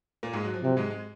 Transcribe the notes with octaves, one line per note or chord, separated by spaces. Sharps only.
A#2 A#3
G#2 G#3
F#3
F3
C3 F#3
G#2 G#3
G#3